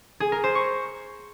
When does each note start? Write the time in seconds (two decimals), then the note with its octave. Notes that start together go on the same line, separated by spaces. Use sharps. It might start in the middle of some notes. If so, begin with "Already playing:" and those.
0.20 G#4
0.32 A#4
0.44 C5
0.55 C#6